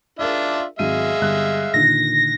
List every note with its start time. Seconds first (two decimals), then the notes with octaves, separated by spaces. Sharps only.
0.19 D4 F4 G#4 A#4 E5
0.79 G#1 F#3 G#3 E5 F5 D#7
1.21 G1 G3 F#6
1.74 A#2 D3 D#3 A#6